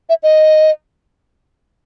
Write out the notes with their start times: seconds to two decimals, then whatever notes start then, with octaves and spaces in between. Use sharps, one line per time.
0.09 E5
0.23 D#5